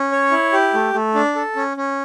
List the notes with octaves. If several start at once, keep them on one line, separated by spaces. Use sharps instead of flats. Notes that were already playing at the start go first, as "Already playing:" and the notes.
Already playing: C#4
C#5
E4
G4
A3
A3
D4
A4
C#4
C#4